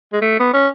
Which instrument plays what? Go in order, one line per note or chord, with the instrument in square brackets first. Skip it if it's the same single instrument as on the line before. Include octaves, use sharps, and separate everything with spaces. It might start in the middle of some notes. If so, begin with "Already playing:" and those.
[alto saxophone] G#3
A3
B3
C#4